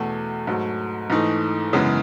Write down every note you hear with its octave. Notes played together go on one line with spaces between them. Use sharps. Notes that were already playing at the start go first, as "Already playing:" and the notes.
Already playing: E2 B2 A3
G#2 F#3 A3
G#2 E3 A3 D#4
F#2 C#3 E3 G#3 B3